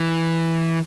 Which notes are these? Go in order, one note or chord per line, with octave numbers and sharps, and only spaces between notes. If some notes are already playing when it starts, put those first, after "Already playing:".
Already playing: E3